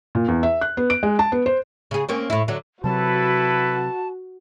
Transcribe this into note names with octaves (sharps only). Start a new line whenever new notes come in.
A#2
E2
E5
F#6
B3
D7
G#3
A5
B3
C5
C#3 G#4
A#3 C4 C#4
A2 E4
D3 F#3
C3 F#3 E4 F#4 A4 B4 A5